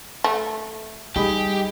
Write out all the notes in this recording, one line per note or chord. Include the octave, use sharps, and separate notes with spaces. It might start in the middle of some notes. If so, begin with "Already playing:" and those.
A3
G3 D#4 G4 G#4 B5